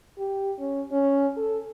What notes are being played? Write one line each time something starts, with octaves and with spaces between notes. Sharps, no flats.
G4
C#4
C#4
A4